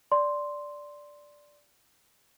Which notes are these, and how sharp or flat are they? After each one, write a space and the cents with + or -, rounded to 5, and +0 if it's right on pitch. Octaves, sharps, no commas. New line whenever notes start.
D5 -5 C6 +0